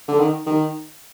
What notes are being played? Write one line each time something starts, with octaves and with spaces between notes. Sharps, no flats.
D3
D#3
D#3